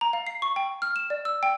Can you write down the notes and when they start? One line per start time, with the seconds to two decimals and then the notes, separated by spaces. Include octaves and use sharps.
0.01 A#5
0.13 F5
0.27 C7
0.42 C#6
0.56 G5
0.82 F6
0.96 E7
1.10 D5
1.25 E6
1.43 G5